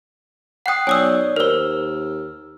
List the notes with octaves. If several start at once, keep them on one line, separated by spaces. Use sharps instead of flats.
F#5 G5 D#6 F#6 C7
B1 C#5 D5 G#5 D#6 E6
D#2 A#4 C5 E6 F6